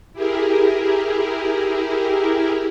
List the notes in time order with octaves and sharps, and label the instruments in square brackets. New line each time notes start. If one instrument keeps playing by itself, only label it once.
[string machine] E4 G4 G#4 A#4